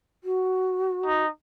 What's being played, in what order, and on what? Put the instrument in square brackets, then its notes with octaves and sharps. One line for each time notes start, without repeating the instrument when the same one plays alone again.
[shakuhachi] F#4
[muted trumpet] D#4